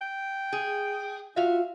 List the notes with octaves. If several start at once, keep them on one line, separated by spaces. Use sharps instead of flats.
G5
G#4
F4 F#4 E5 F5